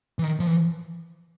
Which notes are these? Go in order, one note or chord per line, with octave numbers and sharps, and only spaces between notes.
E3
D#3
F3
E3